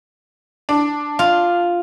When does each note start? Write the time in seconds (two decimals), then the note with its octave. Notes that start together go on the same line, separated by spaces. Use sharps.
0.69 D4
1.19 F4